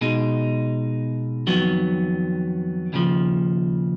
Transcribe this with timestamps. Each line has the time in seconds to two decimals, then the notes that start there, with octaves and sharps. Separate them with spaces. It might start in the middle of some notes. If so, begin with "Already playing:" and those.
0.01 B2 G#3 D#4
1.47 F2 D#3 F#3 B3
2.93 D#2 C#3 F3